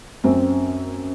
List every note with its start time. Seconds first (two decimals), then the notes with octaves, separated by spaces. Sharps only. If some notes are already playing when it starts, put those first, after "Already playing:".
0.24 F#2 C4